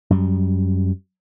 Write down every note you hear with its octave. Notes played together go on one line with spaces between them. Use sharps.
F#2 G3